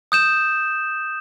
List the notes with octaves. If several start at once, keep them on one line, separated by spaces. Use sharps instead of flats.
D#6 G6 E7